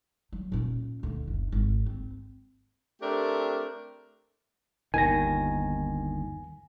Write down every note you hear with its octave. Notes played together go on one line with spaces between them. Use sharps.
F#3
A#2 C#4
D2
F#1
G#1
C4
A3 C4 D4 G4 A#4
G1 D#2 D#3 G#5 A#6